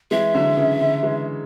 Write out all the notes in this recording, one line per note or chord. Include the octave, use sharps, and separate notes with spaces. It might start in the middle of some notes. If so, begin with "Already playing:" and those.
E3 G#3 E5
D3 F#3
C#3 E3
D3
E3 G#3